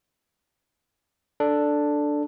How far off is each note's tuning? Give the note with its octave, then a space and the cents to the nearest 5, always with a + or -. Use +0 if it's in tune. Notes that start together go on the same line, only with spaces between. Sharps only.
D4 +0 A4 +0